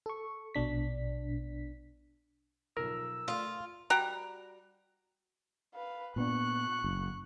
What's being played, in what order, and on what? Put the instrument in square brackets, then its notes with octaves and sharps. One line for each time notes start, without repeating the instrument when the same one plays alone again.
[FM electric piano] A4 C#6
A#1 B2 D4 B6
[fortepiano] B1 F3 [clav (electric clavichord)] A#4 [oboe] E6
[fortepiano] A3 C6 D#6 [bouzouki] F4
[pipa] G3 F#4 G5 A#5
[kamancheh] B4 F5
[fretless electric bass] A#2 B3 D4 [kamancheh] C#6 F#6
[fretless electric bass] F#1